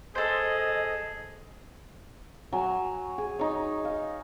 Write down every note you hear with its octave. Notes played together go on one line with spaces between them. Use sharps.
G#4 A4 C5 D#5
F#3 G#5
G#4
D#4 C#5
F5